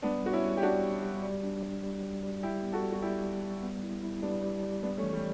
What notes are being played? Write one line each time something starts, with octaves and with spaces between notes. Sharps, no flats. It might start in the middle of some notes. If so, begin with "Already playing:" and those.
G3 B3 D4
G3 F#4
C#4 E4
G3
G4
G3 D4 F#4
G3
G3
G3
D4
G3
G3
G3
G3
G3 E4 G4
B3
F#4 A4
G3
F#4
G3 E4 G4
G3
G3
B3
E4
E4
G3 B3 D4
G3
G3
G3 B3 D4
A3 C#4
E3
G3